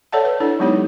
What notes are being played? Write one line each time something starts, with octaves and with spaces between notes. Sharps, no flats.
A4 C#5 D5 E5 F#5 A5
B4
D4 E4 A4 D5
F#3 G#3 B3 D#4 G4 C#5